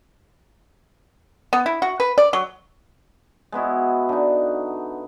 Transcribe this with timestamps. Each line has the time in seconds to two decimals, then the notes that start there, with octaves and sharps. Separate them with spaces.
1.53 B3
1.66 E4
1.82 F#4
2.00 B4
2.18 D5
2.33 F#3
3.52 G#3 B3 E4 F#4
4.09 D3 D#4